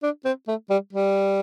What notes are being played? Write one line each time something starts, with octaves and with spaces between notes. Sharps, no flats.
D4
C4
A3
G3
G3